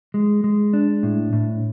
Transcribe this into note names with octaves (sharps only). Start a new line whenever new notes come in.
G#3
G#3
D4
A2
A2